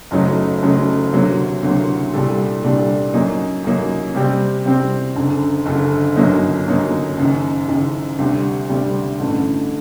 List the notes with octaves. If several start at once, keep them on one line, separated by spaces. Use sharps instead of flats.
F#1 F#2 F#3 A3 D#4
F#1 F#2 F#3 A3 D#4
D2 C3 F#3 A#3
D2 C3 F#3 A#3
C2 A#2 G3 D4 A4
C2 A#2 G3 D4 A4
F#2 F#3 A#3 D#4
F#2 F#3 A#3 D#4
C3 G3 C4
C3 G3 C4
F#1 F#2 D3
F#1 F#2 D3
G1 F#2 F#3 A#3 D#4
G1 F#2 F#3 A#3 D#4
F#1 F#2 D#3
F#1 F#2 D#3
D2 C3 G3
D2 C3 G3
A1 G2 D3 A3